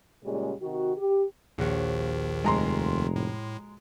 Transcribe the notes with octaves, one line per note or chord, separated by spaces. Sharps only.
A#2 C#3 G3 G#3 C#4
C3 D#3 F#4
G4
A#1 D#2 D#3 F#4 C#5
F1 G#3 A4 A#5 C6
A2